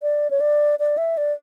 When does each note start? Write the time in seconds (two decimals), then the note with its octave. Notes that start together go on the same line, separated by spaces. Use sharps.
0.02 D5
0.31 C#5
0.40 D5
0.79 D5
0.98 E5
1.17 D5